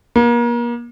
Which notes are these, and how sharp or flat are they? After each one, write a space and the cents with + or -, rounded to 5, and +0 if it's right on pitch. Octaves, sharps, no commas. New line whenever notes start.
A#3 +35